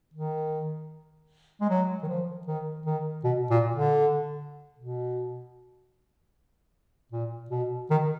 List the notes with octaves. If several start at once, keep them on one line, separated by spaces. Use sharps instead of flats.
D#3
G#3
F#3
D#3
F3
D#3
D#3
B2
A#2
D3
B2
A#2
B2
D#3